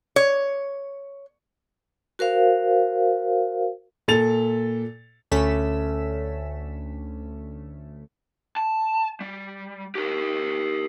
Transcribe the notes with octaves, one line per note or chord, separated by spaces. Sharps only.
C#5
F#4 A#4 C5 F5
A#2 A4 A6 F7
D2 A3 C#4 A4 B6 E7
A5
G3
G4 A#4